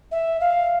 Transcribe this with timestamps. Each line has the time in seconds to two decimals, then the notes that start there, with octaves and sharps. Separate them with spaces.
0.12 E5
0.41 F5